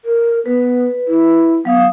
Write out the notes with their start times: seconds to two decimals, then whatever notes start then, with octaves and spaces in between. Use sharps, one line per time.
0.05 A#4
0.46 B3 B4
1.08 E4
1.65 F#3 B3 F5 D#6